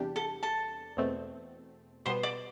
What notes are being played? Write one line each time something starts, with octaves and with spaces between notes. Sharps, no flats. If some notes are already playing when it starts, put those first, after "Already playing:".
Already playing: E2 C3 G3 D4 G4
A4 A5
A4 A5
E2 B2 A3 C4
B2 G3 B3 C5 C6
D5 D6